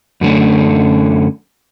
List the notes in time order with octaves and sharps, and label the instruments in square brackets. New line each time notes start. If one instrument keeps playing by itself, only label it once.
[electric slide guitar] F#2 D3 A3 C#4